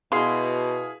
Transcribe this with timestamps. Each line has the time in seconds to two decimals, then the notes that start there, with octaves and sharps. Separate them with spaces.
0.12 B2 E4 G#4 F5 C6